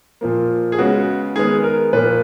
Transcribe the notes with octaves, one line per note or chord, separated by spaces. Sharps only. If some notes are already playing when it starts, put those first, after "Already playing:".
A#2 F3 A#3
G#4
C#3 G#3 B3 F#4
D#3 G#3 B3 G#4
A#4
A#2 F3 A#3 B4